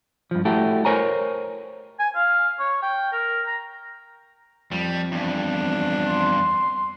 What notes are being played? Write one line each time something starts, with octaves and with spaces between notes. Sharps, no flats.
G2 F3
A3 E4 F#4 G4 A4
A#4 C5 C#5 G#5 A#5
G#5
F5
C#5
G5
A#4
A#5
F2 G3
E2 G2 D4
C6